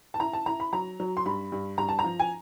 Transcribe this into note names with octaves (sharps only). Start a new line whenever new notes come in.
A5
E4 A#5
A5
E4 A#5
B5
F#3 A#5
F#3
C6
G2 B5
G2
G2 A#5
A5
A#5
F3
G#5